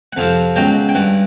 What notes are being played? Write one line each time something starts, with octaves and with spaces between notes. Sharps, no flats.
F#5
F2 C3 F3 F5
C#2 B2 F#3 G5
G5
G2 E3 F#5